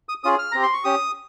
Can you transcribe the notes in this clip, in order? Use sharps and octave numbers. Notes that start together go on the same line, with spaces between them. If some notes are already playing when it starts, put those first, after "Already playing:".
D#6
C#4 F4 G#4 D#6
F6
C4 G4 A#5
C6
C#6
C#4 G4 D#6